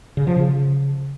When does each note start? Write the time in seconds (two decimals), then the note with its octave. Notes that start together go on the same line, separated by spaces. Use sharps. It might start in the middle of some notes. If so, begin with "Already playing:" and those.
0.17 C#3
0.27 F3
0.37 C#3